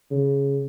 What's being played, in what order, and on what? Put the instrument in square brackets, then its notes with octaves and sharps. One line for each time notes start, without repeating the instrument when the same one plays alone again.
[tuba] C#3